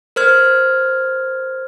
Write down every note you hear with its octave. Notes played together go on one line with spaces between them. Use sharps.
A#4 C5 F6 G#6